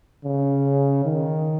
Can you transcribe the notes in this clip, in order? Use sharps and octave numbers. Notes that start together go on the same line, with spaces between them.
C#3
D#3